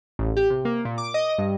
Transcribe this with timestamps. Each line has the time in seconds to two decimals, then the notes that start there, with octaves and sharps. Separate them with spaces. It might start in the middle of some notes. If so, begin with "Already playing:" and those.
0.19 A1
0.37 G4
0.50 C3
0.65 A#3
0.85 A#2
0.98 D6
1.14 D#5
1.38 G2